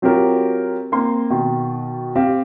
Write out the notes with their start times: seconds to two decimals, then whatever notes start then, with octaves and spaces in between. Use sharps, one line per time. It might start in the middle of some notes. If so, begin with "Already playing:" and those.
0.02 F#3 C4 F4 G4 A#4
0.92 A#3 C4 C6
1.30 B2 D#3
2.16 C4 G4 F5